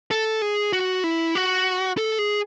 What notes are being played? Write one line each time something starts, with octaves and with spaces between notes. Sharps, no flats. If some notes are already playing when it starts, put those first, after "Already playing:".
A4
G#4
F#4
E4
F#4
A4
G#4